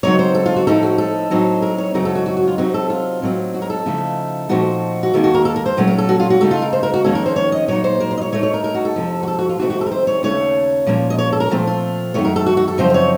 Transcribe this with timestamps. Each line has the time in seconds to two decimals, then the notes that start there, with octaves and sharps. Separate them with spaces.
0.03 C#3 F#3 C4 D#4 C#5
0.19 C5
0.35 A4
0.46 F4
0.56 F#4
0.67 A2 F3 C4 D#4 A4
0.83 F#4
0.98 A4
1.30 A2 F#3 C4 D#4
1.62 A#4
1.78 C#5
1.94 F#2 C#3 F#3 C4 D#4 A#4
2.05 A4
2.15 F#4
2.26 F#4
2.37 F#4
2.48 F4
2.58 C3 F#3 C4 D#4 F#4
2.74 A4
2.90 F4
3.22 A2 F#3 C4 D#4
3.54 F#4
3.62 A#4
3.70 A4
3.86 C#3 F3 A3 D#4
4.49 A#2 F3 A3 C4 D#4 F#4
5.03 F#4
5.14 D#2 D#3 A#3 A4
5.24 F#4
5.35 A#4
5.45 A4
5.56 A#4
5.66 C5
5.77 A#2 F#3 A3 C#4
5.87 A#4
5.98 A4
6.09 F#4
6.20 F4
6.30 F#4
6.41 C#3 A3 D#4 A4
6.51 F4
6.62 A#4
6.73 C5
6.83 A#4
6.94 F#4
7.04 F2 D#3 A#3 C#4 A4
7.15 A#4
7.26 C5
7.36 C#5
7.52 D#5
7.68 A#2 F#3 A#3 D#4 C#5
7.84 C5
8.00 A#4
8.11 C5
8.18 D#5
8.22 C#5
8.32 A2 A3 D#4 C#5
8.43 C#5
8.54 A#4
8.64 A#4
8.75 F#4
8.85 A4
8.96 F2 C3 F3
9.23 F#4
9.28 A4
9.39 F#4
9.49 F4
9.59 F2 C3 D#3 A3 C4 F#4
9.70 F#4
9.81 A4
9.86 A#4
9.92 C5
10.07 C#5
10.23 D#2 C#3 A3 C#4 C#5
10.87 A#2 F3 A#3 C#4
11.10 D#5
11.18 C#5
11.33 A4
11.40 A#4
11.51 A#2 F3 A3 C4
11.67 F4
12.14 F#2 D#3 A3 C#5
12.25 A#4
12.36 A4
12.46 F#4
12.57 F#4
12.68 A4
12.78 F#2 C#3 F3 C4 D#4 C5
12.90 C5
12.94 C#5